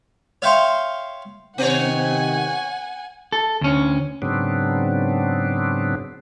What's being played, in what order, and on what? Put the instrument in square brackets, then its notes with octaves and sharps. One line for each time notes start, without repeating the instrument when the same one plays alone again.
[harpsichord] C#5 E5 F5 G5 C6 C#6
[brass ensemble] C3 D#3 [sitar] B3 C#5 [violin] F#5 G#5
[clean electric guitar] A4
D2 C#4
[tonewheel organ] G#2 C#3 F#3 B3 C4 D4